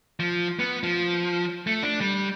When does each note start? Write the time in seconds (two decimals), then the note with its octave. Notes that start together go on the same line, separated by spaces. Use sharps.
0.20 F3
0.59 B3
0.83 F3
1.67 A3
1.83 D4
2.01 G3